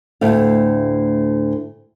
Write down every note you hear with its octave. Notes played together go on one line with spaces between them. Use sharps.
D2 A2 A3 F5